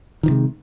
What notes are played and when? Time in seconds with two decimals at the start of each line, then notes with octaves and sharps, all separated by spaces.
0.23 D#3
0.26 E3
0.29 C3
0.31 G#3